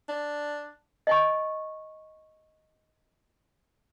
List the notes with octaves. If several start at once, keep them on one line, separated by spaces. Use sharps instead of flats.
D4
D#5 G#5 C#6